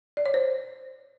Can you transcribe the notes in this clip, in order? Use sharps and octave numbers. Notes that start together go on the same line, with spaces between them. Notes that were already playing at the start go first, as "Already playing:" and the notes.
D5
C#5
C5